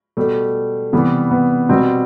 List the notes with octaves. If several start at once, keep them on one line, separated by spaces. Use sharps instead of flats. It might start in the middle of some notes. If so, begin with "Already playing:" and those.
B2 G3 A3
C3 E3 G3 B3
B3
B2 G3 C4